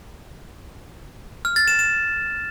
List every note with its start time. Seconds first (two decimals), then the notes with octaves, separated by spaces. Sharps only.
1.45 F6
1.56 A6
1.68 E7
1.79 E7